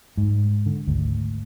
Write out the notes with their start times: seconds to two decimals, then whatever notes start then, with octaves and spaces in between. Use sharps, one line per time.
0.17 G#2
0.66 D3
0.87 G#1 D2